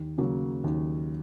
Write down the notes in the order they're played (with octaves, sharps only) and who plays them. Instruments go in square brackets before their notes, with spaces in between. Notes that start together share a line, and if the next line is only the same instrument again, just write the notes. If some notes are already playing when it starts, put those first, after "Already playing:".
Already playing: [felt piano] D#2
C#3 F#3 A#3
D#2